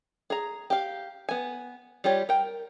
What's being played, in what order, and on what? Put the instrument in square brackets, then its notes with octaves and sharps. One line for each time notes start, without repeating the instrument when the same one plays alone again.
[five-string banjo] G#4 A#5
G4 F5
B3 G#5
G3 F4 G4 C#5
A#4 G5